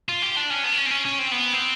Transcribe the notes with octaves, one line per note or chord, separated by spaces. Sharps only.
F4
G4
D4
C#4
B3
D4
C#4
C4
C#4
C#4
C4
B3
C4